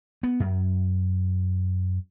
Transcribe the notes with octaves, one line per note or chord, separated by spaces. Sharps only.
B3
F#2